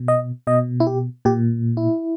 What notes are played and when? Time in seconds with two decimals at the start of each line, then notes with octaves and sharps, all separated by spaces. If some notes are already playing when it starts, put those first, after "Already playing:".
Already playing: B2
0.08 D#5
0.47 B2 D#5
0.80 E4
0.87 G4
1.25 A#2 G4
1.77 E4